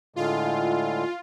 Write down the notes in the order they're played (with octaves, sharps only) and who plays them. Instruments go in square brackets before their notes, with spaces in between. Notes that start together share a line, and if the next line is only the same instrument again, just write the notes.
[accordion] A2 D3 G#3 [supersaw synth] F4